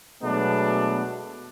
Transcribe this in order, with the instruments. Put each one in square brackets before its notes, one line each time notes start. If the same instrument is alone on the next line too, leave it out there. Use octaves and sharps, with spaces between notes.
[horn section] B2 F#3 G#3 A3 B3 D4